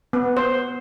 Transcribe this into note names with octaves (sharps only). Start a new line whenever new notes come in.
B3
C5